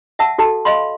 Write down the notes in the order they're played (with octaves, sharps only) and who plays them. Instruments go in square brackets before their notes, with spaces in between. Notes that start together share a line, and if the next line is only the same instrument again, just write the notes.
[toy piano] E5 F#5 A5 E6
F#4 A4 A5
D#5 F5 B5 C6